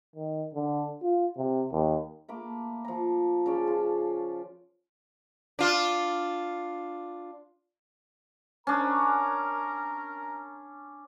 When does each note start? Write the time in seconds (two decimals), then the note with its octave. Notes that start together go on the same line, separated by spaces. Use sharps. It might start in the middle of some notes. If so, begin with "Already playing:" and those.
0.16 D#3
0.54 D3
1.03 F4
1.37 C3
1.72 D#2
2.28 A3 A#3 B5 D6
2.85 F3 A#5
3.46 C#3 C#4 D5 A5
3.67 F4
5.59 D4 F4
8.67 C#4 D4 A#4 A#5